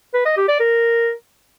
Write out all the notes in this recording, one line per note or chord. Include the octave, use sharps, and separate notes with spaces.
B4
D#5
G4
D5
A#4